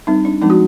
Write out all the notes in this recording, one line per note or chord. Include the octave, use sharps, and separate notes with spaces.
G3 C4 D#4
D4
F3 G#3 C4 D#4
F#4